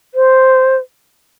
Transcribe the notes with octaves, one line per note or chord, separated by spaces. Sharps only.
C5